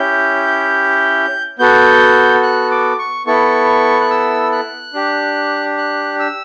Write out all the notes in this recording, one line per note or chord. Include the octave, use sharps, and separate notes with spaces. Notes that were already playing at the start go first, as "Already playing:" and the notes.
Already playing: C#4 E4 G4 G6
B3 F#4 A4 G6
F#6
D6
C#6
B3 E4 A4 C#6
F#6
E6
F#6
D4 G4
F#6
E6